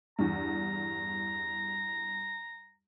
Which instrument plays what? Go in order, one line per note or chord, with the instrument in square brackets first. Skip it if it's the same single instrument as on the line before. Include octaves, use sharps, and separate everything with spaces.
[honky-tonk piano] E2 G2 [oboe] A#5